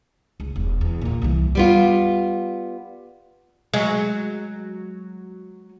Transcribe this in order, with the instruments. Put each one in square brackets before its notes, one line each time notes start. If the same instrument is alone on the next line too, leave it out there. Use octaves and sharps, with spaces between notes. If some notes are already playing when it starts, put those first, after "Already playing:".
[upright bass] C#2
E1
E2
A#2 D3
C2 E3
[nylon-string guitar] G3 B3 F4
[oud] F#3 G#3